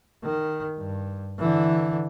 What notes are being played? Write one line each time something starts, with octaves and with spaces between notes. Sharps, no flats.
D#3
G2
D3 E3